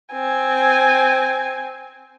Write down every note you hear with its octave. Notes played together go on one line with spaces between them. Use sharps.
C4 G#5